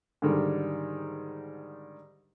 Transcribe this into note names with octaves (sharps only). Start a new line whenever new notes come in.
G#2 D3 D#3 G3